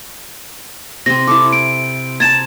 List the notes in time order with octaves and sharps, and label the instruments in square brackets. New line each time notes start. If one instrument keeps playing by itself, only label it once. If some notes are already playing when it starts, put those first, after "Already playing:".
[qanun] C3 C4 [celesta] A#6
[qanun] E4 A4 [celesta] D6
[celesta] D7
[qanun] A5 A#5 [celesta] G#6 A6 E7